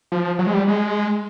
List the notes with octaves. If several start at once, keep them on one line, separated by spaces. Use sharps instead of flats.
F3
F#3
G#3
G3
G#3